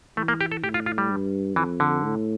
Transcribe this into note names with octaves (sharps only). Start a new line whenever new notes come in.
E3 A3
A#3
G4
A4
A2 G4
F4
F4
G3
G2
F2 E3
D3
A2